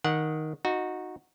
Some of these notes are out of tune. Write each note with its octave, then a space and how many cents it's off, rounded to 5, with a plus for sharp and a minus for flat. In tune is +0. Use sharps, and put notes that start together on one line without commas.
D#3 +5 F#5 -15
D#4 +0 F#4 -15